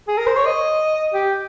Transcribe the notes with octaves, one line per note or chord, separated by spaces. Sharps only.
G#4
A#4
C5
C#5
D#5
G4